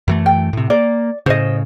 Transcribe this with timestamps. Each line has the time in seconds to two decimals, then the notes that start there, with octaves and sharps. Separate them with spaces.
0.08 F#2 E3 A3
0.26 G5
0.53 A2 C3
0.70 A#3 D5
1.26 A2 C#3 C5 D#5